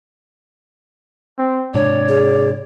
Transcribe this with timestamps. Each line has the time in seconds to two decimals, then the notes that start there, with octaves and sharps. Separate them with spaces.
1.38 C4
1.74 G#2 C3 D4 C#5 D5
2.09 G#4